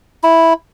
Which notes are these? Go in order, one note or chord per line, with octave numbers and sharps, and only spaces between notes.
E4